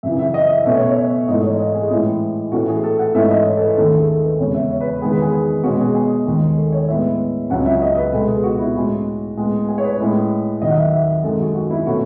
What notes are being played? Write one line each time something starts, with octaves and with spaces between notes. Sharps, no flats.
F#2 C#3 E3 E5
E5
D#5
E5
B2 A3 C#4 E5
C#5
C#5
E5
G#2 E3 A3 D#5
C#5
D#5
G#4
A2 E3 G#3 C#4 E4
A2 E3 A3 C#4 F#4
G#4
A4
F#5
G#2 E3 A3 C#4 E5
D#5
C#5
A4
B4
D#2 D#3 A3 C#4 A4
G#4
A4
B4
E2 C#3 G#3 C#4 C#5
E5
C#5
B4
E2 D#3 G#3 B3 G#4
B4
G#4
G#4
B2 G#3 C#4 F#4
G#4
G#4
D#2 D#3 G#3
A4
C#5
A2 G#3 B3 E5
C#2 C#3 F#3 C#4 F#5
E5
D#5
B4
B2 G#3 B3 A4
G#4
F#4
E4
A2 G#3 C#4 F#4
A2 G#3 B3
G#4
C#5
B4
A2 G#3 C#4
D#2 D#3 F#3 D#5
F#5
E5
E5
F#2 D#3 G#3 A4
F#4
F#4
E4
B2 A3 C#4 F#4